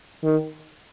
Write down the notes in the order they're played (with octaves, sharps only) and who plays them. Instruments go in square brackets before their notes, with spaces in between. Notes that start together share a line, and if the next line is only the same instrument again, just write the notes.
[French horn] D#3